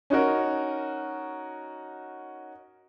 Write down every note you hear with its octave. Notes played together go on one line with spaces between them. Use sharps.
C#4 D#4 F#4 A#4